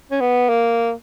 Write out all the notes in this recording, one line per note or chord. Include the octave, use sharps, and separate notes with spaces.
C#4
B3
A#3